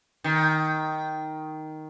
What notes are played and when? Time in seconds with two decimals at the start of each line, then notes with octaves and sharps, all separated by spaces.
0.24 D#3